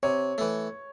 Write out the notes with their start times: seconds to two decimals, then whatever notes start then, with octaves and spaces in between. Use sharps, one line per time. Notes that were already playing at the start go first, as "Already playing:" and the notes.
0.03 C3 C#5
0.38 E3 A3